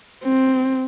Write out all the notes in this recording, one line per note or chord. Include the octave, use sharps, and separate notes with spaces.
C4